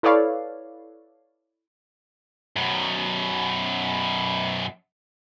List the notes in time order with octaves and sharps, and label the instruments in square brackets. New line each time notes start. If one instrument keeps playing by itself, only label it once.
[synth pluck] E4 A4 B4 C#5 D5 F5
[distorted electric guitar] F#2 B2